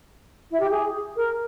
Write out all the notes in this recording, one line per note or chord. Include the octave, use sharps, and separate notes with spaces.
E4
G4
G#4
A#4